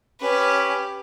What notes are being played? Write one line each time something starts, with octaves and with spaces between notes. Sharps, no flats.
C#4 G4 B4